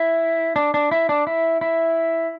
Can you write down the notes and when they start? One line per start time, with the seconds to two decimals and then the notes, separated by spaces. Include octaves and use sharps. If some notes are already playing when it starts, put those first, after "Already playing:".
Already playing: E4
0.56 D4
0.74 D4
0.91 E4
1.09 D4
1.27 E4
1.61 E4